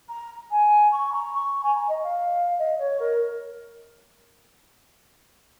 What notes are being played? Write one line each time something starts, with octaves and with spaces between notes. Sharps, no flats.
A#5
G#5
C#6
A#5
C#6
G#5
A#5
D#5
F5
D#5
C#5
A#4